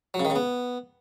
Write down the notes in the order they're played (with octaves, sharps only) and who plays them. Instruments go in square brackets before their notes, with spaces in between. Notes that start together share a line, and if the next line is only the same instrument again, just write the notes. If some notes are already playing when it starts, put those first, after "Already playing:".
[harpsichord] F#3
C#3
D#3
C#3
B3